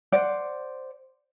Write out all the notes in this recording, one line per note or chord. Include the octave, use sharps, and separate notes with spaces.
C5 D5 F#5